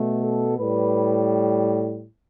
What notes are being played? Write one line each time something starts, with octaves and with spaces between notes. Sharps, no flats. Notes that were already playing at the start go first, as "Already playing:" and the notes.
Already playing: B2 A3
A4
A2 G3 B4